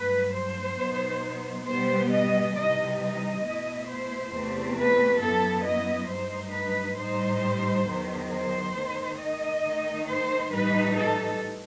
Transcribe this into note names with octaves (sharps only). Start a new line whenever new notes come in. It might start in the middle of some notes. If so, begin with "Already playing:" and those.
Already playing: G2 F#3 A3 B4
C5
B2 F#3 B3 D#4
B2 G3 B3 C5
D#5
C3 E3 G3 D#4 D#5
D#5
B2 A3 E4
C5
E2 C3 E3 A3 C4
B4
F#2 F#3 B3 E4 A4
D#5
G2 F#3 A3 D#4 C5
B4
A2 G3 D#4 C5
E2 D#3 F#3
C5
D#3 A3 D#4
D#5
D#3 A3 D#4
C5
A2 E3 G3 D#4 B4
A4